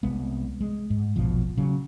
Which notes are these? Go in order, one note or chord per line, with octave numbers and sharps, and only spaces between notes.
C2 G#3 B3
G#3
G#2
E1 A#1 B2 F3
C#3 F#3